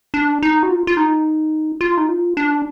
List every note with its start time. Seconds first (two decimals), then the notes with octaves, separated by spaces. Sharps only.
0.14 D4
0.42 D#4
0.63 F#4
0.69 F4
0.87 F4
0.97 D#4
1.81 F4
1.98 D#4
2.09 F4
2.37 D4